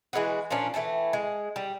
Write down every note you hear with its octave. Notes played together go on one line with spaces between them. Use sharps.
E3 G#3 B3 F#4
A#2 F3 C#4 D4
E3 A3 G5 A5
G#3
G3